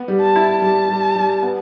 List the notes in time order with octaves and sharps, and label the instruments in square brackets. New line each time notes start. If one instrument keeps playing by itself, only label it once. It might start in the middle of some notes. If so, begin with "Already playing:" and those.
Already playing: [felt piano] B3
G3
[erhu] A5
[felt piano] E4
[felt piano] G3 [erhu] A5
[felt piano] G3
G3
B3